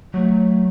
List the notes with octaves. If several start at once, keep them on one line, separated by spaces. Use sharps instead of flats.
F#3 A3